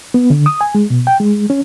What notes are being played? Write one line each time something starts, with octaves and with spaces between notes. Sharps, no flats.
B3
D3
D#6
G#5
G#3
B2
G5
G#3
C#4